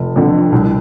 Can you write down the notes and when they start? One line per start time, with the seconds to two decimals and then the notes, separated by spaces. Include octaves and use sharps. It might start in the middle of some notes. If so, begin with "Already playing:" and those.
Already playing: F1
0.16 F2 D3
0.52 C2